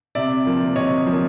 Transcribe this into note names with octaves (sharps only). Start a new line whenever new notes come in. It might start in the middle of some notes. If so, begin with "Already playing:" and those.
C3 D5 E5
F3 A#3
C3 C#5 D#5
F3 A#3